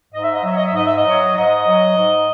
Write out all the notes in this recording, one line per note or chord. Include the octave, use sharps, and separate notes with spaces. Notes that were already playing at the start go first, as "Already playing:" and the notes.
G#2 D#5
E5
D#5
F#3 E5
D#5
E5
G#2 D#5
E5
D#5
F#3
G#2 D#5
F#3
G#2